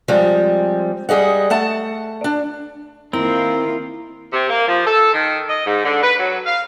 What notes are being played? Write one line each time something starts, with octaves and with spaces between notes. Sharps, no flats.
F3 G3 G#3 C4
G3 G#4 D#5 F#5
A3 F#5 A5
D4
D#3 A#3 C4 E4 F4 A#4
C3
A#3
F3
A4
D#3
D#5
G#2
D3
B4
F#3
F5